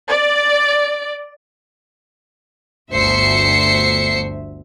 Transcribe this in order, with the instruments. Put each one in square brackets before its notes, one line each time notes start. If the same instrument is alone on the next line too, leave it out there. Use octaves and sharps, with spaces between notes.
[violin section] D5
[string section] G1 D2 C5 E5 C7 C#7